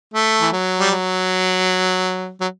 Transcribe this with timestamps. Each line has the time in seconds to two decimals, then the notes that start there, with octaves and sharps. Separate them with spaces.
0.14 A3
0.41 E3
0.52 F#3
0.80 G3
0.91 F#3
2.41 F#3